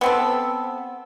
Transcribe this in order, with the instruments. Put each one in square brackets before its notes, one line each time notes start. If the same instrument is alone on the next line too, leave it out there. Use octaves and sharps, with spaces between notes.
[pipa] B3 C4 A4